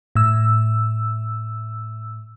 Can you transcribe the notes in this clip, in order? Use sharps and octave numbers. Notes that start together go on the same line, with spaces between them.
A2 E6